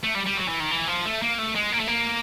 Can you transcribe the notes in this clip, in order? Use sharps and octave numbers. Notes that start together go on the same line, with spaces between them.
A3
G3
G3
F#3
E3
D#3
E3
F3
A3
A#3
A3
G#3
A#3
A3
A#3